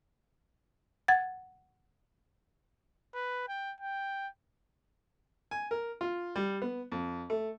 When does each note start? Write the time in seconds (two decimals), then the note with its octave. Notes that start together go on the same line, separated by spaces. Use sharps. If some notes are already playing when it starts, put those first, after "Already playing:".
1.08 F#5 G#6 A6
3.14 B4
3.49 G5
3.81 G5
5.51 G#5
5.71 A#4
6.01 F4
6.36 G3
6.62 B3
6.92 F2
7.30 A3